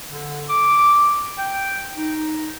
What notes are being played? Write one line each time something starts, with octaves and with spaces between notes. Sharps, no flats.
D3
D6
G5
D#4